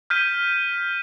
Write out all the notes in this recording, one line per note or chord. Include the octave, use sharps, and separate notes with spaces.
F6 G6 B6 D#7